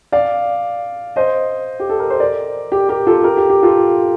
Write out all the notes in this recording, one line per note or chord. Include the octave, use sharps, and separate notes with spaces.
D5 F5
C5 D#5
G4
A4
A#4
C5
A#4 D5
G4
G4 A#4
F4 A4
G4 A#4
G4
G4
F4 A4